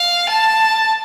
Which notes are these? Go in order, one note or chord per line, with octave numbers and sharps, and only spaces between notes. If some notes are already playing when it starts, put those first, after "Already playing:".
Already playing: F5
A5